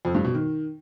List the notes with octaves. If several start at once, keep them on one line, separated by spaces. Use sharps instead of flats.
F2
G2
B2
D#3